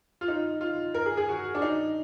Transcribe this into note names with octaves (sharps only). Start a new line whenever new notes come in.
F4
D#4
F4
A#4
G#4
G#4
F#4
D4
D#4